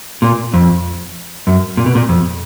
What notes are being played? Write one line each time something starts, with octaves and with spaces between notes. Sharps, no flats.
A#2
F2
F#2
A#2
B2
A#2
F2